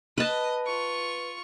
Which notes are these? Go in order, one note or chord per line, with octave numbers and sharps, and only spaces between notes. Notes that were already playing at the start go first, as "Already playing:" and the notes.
B4 D#5 A5
F4 C#6